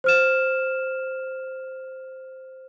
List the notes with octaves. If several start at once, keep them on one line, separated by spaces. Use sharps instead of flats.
C5 F6 E7